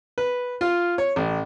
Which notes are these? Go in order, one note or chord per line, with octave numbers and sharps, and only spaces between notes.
B4
F4
C#5
A1